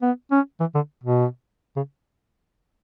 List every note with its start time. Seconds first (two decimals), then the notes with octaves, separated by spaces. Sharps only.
0.02 B3
0.31 C#4
0.60 E3
0.75 D3
1.04 B2
1.76 C#3